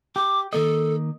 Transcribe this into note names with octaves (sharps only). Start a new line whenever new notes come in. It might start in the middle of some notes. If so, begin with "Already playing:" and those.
G4 D6
D#3 A#3 A4 D#5